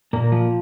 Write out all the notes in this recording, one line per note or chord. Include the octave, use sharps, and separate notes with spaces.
A#2 A#3
F3